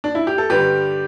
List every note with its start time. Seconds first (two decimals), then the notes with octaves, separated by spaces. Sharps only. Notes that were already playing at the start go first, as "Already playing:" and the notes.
0.04 D4
0.15 E4
0.27 G4
0.38 A4
0.50 G2 D3 G3 G4 B4